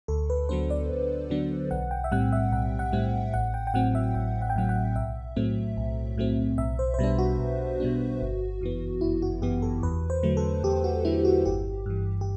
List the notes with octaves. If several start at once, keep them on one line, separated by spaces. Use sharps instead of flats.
D2 A4
B4
D3 F#3 B3 D4 C5
D5
D2
D3 F#3 B3 D4
B1 F#5
G5
E5
A2 G3 C4 F#5
E5
B1 F#5
F#5
A2 G3 C4
A1 F#5
G5
G5
A2 F#3 C4 F#5
E5
A1 G5
F#5
G5
A2 F#3 C4 F#5
F#5
B1 E5
A2 F#3 A3 C4
B1
A2 F#3 A3 C4
B1 E5
C5
C5
B2 G3 B3 D4 B4
F#4
B1
B2 G3 B3 D4
G1
F#2 E3 B3
G1 E4
F#4
F#2 E3 B3 G4
A4
E2 B4
C5
D3 F#3 A3
A4
E2 G4
F#4
D3 F#3 A3 E4
F#4
G1 G4
G2 E3
G4